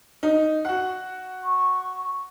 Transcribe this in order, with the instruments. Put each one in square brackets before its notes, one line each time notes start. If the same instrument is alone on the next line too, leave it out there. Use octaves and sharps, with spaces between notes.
[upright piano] D#4
F#4 F#5
[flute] C#6